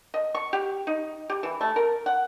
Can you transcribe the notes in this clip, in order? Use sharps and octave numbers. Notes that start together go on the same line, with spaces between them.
D#5
C#6
G4
D#4
G4
E3
A3
A#4
F#5